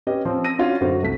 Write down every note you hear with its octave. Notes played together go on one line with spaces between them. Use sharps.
C#4 G4 B4 D#5
F3 C4 C#4
E6 A#6 D#7
C#4 D4 F4 F#4
F#2 D3 F#4 C5
C2 A3 B6